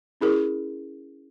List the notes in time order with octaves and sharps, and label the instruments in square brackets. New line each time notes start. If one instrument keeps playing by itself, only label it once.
[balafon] C#4 E4 G#4 A#4